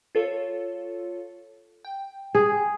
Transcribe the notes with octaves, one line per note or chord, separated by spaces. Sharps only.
F4 A4 C#5
G5
G#4